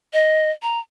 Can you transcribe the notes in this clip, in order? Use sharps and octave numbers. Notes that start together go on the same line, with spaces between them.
D#5
A#5